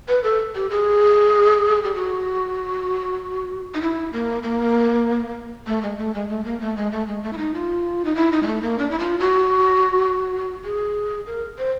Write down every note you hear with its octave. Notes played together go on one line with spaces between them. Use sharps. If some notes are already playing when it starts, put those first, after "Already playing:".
B4
A4
G4
G#4
G4
F#4
D#4
E4
A#3
A#3
A3
G#3
A3
G#3
A3
A#3
A3
G#3
A3
G#3
A3
E4
D#4
F4
D#4
E4
D#4
G#3
A3
A#3
D4
E4
F4
F#4
G#4
A#4
C5